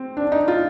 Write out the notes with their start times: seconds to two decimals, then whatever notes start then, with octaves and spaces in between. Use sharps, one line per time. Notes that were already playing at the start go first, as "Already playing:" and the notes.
Already playing: C4
0.17 D4
0.32 D#4
0.48 F4